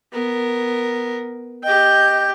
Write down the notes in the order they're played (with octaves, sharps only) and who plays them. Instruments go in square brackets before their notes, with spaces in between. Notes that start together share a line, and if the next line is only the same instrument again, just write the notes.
[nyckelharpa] B3 A#4
[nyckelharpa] G4 G5 [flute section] D#5 G6